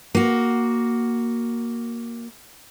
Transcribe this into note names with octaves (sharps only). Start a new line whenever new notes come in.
A#3 F#4